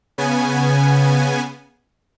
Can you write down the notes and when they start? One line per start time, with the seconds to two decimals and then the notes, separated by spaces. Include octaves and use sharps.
0.18 C#3 B3 G#5